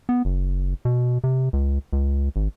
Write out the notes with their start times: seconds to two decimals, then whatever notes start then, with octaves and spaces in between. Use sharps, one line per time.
0.09 B3
0.25 F#1
0.85 B2
1.24 C3
1.53 C#2
1.93 C#2
2.36 G#1